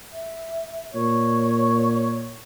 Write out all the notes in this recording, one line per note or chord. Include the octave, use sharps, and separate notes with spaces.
E5
A#2 C#5 C#6